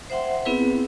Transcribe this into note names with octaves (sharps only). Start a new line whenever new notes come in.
C5 E5 F#5 G5 C6
B3 C4 E4 G#4 B4